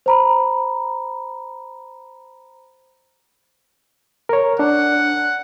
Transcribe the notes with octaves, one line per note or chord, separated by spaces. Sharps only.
C5 A#5 B5
A#4 C#5
D4 F#5